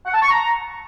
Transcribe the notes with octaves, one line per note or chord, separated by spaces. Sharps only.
F#5
A5
C#6
A#5